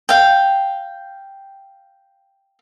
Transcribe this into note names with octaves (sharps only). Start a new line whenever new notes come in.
F5 G5